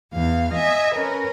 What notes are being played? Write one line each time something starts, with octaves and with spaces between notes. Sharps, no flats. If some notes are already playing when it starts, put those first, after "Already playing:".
E2 F5
D#5 E5 G#5
C#4 A#4 B4